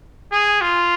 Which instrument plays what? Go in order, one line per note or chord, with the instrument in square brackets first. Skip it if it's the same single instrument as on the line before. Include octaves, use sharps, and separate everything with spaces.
[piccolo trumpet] G#4
F4